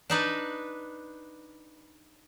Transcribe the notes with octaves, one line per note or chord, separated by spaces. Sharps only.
D4 D#4 B4